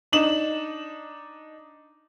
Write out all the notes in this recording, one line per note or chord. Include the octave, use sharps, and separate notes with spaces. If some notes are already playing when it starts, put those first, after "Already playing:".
D4 D#4 E7 F#7